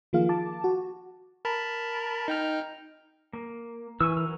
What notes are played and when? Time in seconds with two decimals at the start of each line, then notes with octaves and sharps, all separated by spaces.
0.13 D#3 F3 A#3 F4 G#4 F5
0.29 A5 D6
0.64 F#4
1.45 A#4 A5 B5
2.28 D#4 G5 F6
3.33 A#3
4.01 E3 G#5 C#6 E6
4.17 F#3 A#4